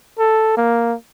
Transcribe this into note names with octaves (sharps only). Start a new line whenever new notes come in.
A4
A#3